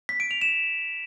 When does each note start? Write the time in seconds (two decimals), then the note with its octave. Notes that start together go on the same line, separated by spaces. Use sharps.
0.09 B6
0.20 D7
0.31 F7
0.41 E7